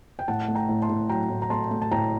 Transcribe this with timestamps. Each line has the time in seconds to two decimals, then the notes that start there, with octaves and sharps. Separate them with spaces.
0.19 G5
0.28 A2 F#5 A5
0.48 A3
0.55 G5 A#5
0.69 A2
0.82 A5 C6
0.89 A2
1.09 F#3 G5 A#5
1.30 A2
1.42 A#5
1.50 A3 A5 C6
1.71 A3
1.82 A5
1.91 A2 G5 A#5